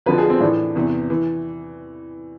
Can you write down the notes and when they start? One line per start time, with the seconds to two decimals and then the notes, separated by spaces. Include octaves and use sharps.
0.06 F2 D3 F3 B4
0.18 G#4
0.30 C4
0.40 A2 E3 D4
0.75 E2 C3 E3
1.10 E3